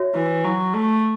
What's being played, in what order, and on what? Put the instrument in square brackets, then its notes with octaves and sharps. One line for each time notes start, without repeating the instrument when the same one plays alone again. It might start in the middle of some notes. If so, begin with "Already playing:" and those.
Already playing: [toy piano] F#4 C#5 E5
[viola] E3
F#3
A3